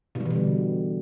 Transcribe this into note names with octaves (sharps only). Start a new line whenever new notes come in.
B2
G3
E3
B2
D3